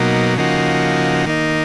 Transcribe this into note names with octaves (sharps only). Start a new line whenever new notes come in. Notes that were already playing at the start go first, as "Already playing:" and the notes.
Already playing: B2 F#3 A#3 D#4
C#3 F3 A#3 D#4 F#4
D#3 A#3 D#4